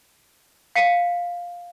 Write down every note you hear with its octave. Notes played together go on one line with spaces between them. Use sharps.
F5 B6 C#7 D#7